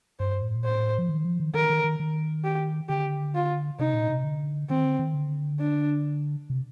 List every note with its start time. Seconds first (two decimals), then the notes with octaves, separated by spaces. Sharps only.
0.20 G2 C5
0.42 A2
0.55 A#2
0.65 A2 C5
0.99 F3
1.09 D#3
1.25 F3
1.40 D#3
1.54 D#3 A#4
1.70 D#3
1.84 D#3
2.00 D#3
2.44 G4
2.89 D3 G4
3.35 F4
3.79 C3 D#4
3.94 A#2
4.09 C3
4.24 D3
4.70 D#3 C4
4.85 D3
4.99 D#3
5.14 D3
5.60 D4
6.50 C3